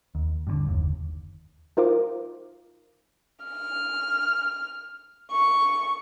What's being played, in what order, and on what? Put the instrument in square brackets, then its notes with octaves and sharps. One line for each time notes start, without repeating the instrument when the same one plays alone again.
[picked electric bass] D#2
G2 B2 D3
F#1 D#2
[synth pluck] D#4 F4 A#4 C5 F5 D6
[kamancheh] F6
C#6